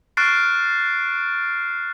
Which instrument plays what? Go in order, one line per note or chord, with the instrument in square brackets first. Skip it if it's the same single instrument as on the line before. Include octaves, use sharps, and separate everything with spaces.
[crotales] C#6 F6 F#6 A6 C7 D7